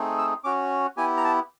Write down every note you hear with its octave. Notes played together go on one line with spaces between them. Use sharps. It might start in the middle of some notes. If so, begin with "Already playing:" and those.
Already playing: A3 C4 D#4 G#4
E6
C#4 F#4 D6
B3 E4 G4 G#5
A#5
A5